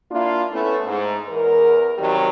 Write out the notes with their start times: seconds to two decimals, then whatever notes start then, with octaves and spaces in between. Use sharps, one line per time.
0.11 A#3 D4 E4 F4
0.50 A3 B3 C#4 E4
0.86 G#2
1.28 E2 A#4
1.97 C3 D#3 F#3 G3